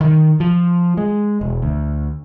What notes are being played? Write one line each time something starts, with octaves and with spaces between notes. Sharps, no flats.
D#3
F3
G#3
E1
D2